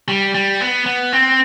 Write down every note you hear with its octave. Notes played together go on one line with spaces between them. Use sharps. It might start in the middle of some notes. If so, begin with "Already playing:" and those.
G3
G3
B3
B3
C4